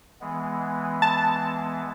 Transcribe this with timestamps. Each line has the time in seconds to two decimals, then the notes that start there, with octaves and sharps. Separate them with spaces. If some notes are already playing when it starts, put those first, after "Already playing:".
0.21 E3 G#3 B3
1.02 A5